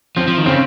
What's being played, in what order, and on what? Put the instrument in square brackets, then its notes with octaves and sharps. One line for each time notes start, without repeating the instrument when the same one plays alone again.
[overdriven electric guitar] F3 [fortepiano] C4
[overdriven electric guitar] F3
D#3
[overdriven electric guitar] C#3 [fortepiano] C4